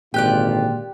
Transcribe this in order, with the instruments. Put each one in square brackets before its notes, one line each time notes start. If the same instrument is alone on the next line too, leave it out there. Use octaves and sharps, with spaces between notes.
[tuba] G#1 [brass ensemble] A#2 D3 F4 [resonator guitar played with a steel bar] G4 D5 [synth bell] G5 F#6